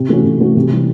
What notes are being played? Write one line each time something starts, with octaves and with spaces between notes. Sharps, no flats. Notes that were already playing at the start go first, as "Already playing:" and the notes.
Already playing: C3
E3 A3 C#4 F#4
C3
E3 A3 C#4 F#4
C3
E3 G3